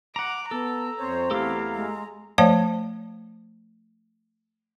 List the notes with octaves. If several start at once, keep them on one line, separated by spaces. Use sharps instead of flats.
F#5 A#5 D6
B3 A4 A#5
F2 C4 C5 C#5
E2 A3 E4 G4 A4 F5
G#3
F3 A3 C5 C#5 F5 A5